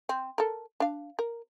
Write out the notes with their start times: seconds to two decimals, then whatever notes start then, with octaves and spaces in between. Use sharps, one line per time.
0.09 C4
0.38 A4 A#4
0.80 D4 F5
1.19 A#4